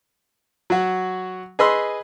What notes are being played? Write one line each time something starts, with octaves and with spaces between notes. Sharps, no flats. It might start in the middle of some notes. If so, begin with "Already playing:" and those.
F#3 F#4
G#4 B4 D#5 B5 C6 E6